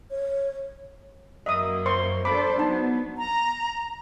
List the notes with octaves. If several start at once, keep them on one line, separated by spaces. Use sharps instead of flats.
C#5
F#2 F#3 A#3 D#5 E5 D#6
C5 C6 C#6
D4 A4 C5 B5 D6
F#3 B3 D4 D#4 A5
A#5